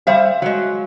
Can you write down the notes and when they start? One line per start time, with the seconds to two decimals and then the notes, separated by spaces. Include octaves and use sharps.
0.07 G3 C5 E5 F5
0.42 F#3 G#3